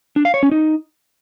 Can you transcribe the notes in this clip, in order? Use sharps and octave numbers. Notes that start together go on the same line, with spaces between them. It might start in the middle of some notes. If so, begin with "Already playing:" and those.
D4
F5
C#5
C#4
D#4